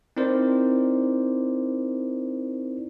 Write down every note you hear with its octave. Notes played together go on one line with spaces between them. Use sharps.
C4 D#4 E4 A#4 C5 D5